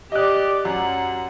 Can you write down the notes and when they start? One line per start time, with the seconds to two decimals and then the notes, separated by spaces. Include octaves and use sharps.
0.12 G4 D5 D#5 F#6
0.65 F#2 F#5